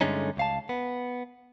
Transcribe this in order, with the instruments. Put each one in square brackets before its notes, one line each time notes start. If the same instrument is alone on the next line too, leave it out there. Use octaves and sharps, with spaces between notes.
[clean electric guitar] G2 D3 G#3 A3 C#4 D#4
C#2 F5 A5
B3